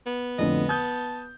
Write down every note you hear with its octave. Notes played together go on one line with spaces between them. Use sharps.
B3
F2 A2 D3 D#5
A5 D#6 G6